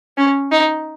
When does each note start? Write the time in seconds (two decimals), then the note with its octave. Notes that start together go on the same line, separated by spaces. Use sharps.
0.17 C#4
0.52 D#4